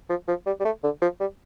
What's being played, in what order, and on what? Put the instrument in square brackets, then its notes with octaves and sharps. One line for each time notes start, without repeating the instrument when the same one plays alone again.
[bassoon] F3
F3
G3
G3
A3
D3
F3
G3